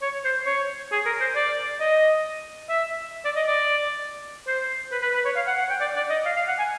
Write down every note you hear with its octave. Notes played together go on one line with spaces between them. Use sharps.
C#5
C5
C#5
G#4
A#4
C5
D5
D#5
E5
D5
D#5
D5
C5
B4
B4
B4
C#5
F5
F#5
F#5
G5
D5
D5
D#5
F5
F5
F#5
G#5